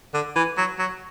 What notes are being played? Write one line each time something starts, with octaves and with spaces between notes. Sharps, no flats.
D3
E3
F#3
F#3